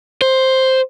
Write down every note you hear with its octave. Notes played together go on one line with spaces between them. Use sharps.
C5